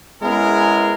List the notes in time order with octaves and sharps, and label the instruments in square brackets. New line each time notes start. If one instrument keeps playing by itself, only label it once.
[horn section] G#3 B3 C#4 E4 G#4 A#4